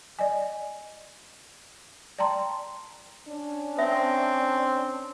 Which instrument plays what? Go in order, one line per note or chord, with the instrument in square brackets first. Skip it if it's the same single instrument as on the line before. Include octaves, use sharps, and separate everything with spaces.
[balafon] D5 D#5 G#5
D5 G5 A5 A#5 C6
[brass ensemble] C#4 D4
[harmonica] C4 [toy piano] E5